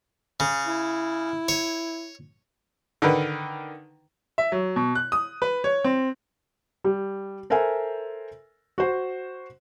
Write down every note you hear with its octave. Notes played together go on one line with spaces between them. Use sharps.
C#3
E4
C#5
D3 D#3 B4
E5
F#3
B2
F#6
D#6
B4
C#5
C4
G3
A4 A#4 C5 E5 G#5
F#4 C5